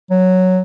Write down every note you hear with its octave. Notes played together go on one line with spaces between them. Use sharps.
F#3